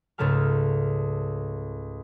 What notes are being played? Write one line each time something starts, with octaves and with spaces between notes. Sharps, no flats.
C#2 G#2 C#3 A3 A5 F6